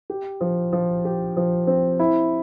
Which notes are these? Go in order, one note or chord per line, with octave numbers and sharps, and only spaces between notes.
G4
F3
F3
G4
F3
C4
E4